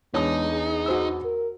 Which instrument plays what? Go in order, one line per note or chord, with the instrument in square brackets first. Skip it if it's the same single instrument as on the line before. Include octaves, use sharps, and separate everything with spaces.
[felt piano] E2 D4 D#6 [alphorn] G#3 [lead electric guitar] D#4 [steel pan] C#5
[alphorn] G#4
[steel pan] F#4 C5 E6
[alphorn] A#4